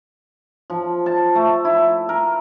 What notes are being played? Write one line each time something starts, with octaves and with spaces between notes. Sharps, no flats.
F3
A5
A3
E4
A#4